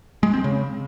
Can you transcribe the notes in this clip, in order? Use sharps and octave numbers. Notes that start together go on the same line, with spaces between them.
G#3
C4
C#3